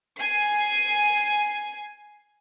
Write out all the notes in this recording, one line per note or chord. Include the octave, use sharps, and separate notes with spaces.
G#5 C7